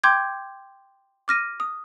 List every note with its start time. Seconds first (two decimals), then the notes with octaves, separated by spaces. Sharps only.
0.04 G5 C6 D6 G6 G#6
1.28 D6 F6 A#6 D#7
1.60 D#6